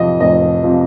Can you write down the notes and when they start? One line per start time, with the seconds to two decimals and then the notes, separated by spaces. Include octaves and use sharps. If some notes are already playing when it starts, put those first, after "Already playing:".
Already playing: F2 C3 F3 D#5
0.20 F1 D#5
0.64 C3 F3